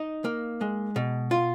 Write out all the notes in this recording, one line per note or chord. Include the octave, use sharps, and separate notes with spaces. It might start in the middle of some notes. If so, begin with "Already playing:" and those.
Already playing: D#4 D#5
A#3
G#3
B2
F4